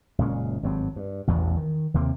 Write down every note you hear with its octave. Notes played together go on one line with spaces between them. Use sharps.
F#1 A#2 G#3 C#4
G#1 G2 F#3 C4
G2
A1 E2 G2 B2
D#3
D#2 C3 A#3 C4